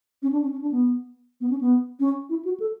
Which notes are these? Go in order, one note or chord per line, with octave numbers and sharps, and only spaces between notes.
C#4
D4
C#4
C#4
D4
B3
B3
C#4
B3
C#4
E4
F#4
A4